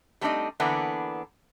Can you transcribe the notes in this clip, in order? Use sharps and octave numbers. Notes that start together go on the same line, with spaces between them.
G3 A3 C4 D4 D#4 D#5
D3 E3 A#3 B3 D4